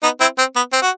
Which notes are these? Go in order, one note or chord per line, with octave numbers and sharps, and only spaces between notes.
B3 D#4
C4 E4
C4
B3
C4
F#4